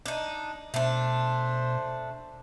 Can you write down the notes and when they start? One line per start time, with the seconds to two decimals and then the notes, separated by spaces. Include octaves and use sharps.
0.06 D4 D#4
0.74 B2 A3 D4 C5